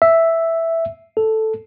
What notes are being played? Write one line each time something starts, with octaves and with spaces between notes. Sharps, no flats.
E5
A4